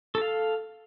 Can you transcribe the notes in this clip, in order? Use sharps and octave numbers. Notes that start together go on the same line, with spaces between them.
A4 F5 A5